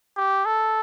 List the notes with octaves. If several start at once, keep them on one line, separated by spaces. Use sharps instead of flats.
G4
A4